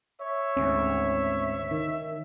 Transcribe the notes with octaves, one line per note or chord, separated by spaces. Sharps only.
C#5 E5
G#1 D2 C#4
D#3